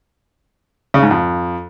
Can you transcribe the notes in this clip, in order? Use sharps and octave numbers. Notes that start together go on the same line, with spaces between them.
C#3
G#2
F2